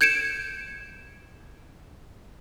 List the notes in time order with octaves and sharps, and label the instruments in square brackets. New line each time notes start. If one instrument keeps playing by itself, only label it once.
[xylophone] G6 G#6 C#7 D7 E7